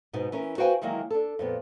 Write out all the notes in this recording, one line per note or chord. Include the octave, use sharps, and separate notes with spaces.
G#2 B2 B3 D#4
E3 C#4 A#4
F#4 B4 C5 F5 G5 G#5
D#3 E3 F#3 G#3 A#3
D4 A4
F2 A#2 B3